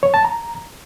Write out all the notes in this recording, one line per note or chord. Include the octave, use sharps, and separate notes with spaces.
C#5
A5
A#5